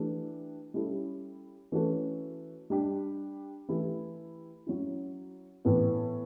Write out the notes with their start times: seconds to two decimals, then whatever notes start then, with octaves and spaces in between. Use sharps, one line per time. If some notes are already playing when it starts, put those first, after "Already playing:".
Already playing: E3 A3 D4 G4
0.74 G3 C#4 E4 A4
1.72 E3 A3 C#4 F#4 A4
2.70 G3 D4 G4
3.68 E3 A3 E4 G4
4.67 F#3 C#4 E4
5.65 A2 E3 B3